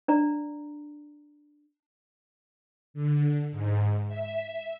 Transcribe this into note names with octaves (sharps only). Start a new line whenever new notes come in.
D4 D5 A#5
D3
G#2
E5